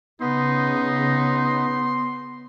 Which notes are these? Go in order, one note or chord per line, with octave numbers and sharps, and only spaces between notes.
C#3 B3 D#4 C6